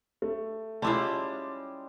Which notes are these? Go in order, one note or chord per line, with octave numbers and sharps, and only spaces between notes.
A3
G3 G#3 C#4 E4 F4 A5 D6